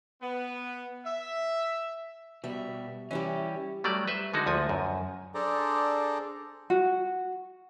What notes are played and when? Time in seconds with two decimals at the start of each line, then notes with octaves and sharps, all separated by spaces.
0.22 B3
1.06 E5
2.44 B2 G3 E5
3.11 E3 G3 C#4 E4 G4
3.84 F#3 G3 A3 D5
4.08 B4 C5 E5
4.34 D3 G#3 D#4 F#4
4.46 D2 F3 G#5
4.69 F#2
5.35 D4 G#4 A4 C5 D5 A#5
6.70 F#4